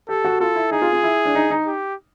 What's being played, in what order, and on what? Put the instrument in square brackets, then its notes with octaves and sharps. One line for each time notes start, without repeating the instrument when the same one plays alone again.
[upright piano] G4 [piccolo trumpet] A4
[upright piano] F#4
[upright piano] F4 [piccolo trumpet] A4
[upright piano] E4
[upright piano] D#4 [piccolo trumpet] G#4
[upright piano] F4
F4
E4
D4
D#4
D#4
[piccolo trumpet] G4